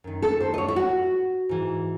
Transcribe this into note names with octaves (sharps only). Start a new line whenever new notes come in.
F#2 D#3
A4
C5
D#5
C#5
E4
F#4
G#2 E3